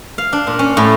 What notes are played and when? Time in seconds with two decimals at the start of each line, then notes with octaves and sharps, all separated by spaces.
0.18 F5
0.33 D4
0.47 A#2
0.59 C#4
0.77 A2